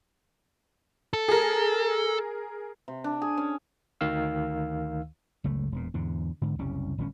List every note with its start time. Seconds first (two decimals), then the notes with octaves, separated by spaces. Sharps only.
1.13 A4
1.28 G#4 A#4
2.88 C3
3.04 D4
3.22 G#4
3.37 C#4
4.01 D2 D#3 F5 E6
5.44 F#1 C#2 A3
5.72 E1 A#2
5.94 E2 G#2 D3
6.42 G#2 D3
6.59 F#1 C2 G3 C#4
6.98 G1 A2 C#4